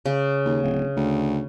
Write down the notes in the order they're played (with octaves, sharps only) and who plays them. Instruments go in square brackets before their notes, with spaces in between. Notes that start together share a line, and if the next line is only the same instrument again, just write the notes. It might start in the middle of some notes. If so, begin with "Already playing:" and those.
[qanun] C#3
[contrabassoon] D#2
D1
D2